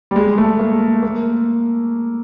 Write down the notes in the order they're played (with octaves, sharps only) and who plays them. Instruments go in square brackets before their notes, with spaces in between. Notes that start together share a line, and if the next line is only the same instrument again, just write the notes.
[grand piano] G3
G#3
A3
A#3
A#3